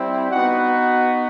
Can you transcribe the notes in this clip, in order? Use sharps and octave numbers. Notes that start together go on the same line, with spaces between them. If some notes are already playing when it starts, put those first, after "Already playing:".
Already playing: G3 C4 E4
B3 D#4 F#4 F#5